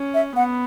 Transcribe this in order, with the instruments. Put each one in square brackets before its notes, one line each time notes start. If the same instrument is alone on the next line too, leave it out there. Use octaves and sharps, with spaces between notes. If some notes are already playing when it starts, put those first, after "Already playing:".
Already playing: [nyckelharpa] C#4
[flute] E5
[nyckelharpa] B3 [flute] F#5